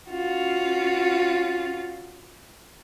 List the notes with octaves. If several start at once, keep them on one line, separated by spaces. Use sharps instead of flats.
C#4 F4 F#4